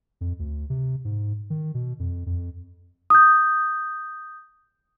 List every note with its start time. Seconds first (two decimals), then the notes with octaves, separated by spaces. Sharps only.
0.21 F2
0.39 D2
0.70 C3
1.05 G#2
1.50 D#3
1.74 B2
1.99 F2
2.26 F2
3.10 D#6 G6